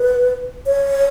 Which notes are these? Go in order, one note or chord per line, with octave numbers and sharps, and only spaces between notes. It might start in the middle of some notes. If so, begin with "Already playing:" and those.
Already playing: B4
C#5